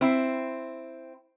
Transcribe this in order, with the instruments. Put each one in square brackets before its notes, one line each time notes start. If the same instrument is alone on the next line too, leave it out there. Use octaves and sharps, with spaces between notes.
[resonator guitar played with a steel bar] C4 E4